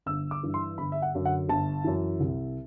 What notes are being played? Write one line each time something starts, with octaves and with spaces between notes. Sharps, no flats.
G1 E6
D6
G2 E3
C6
G1 B5
E5
F#5
F#2 D3
F#5
G1 A5
F#2 E3
C2